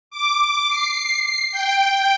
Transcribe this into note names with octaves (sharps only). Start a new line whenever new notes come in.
D6
C7
G5